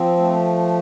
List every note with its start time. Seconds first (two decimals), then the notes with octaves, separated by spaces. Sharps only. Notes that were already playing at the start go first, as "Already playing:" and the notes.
Already playing: F3 C4
0.17 A3